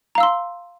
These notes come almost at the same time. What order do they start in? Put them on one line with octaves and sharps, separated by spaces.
A#5 F5 E6 C6